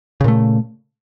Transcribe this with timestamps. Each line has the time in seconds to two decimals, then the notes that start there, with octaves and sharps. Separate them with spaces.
0.21 C#3
0.24 A#2
0.28 A3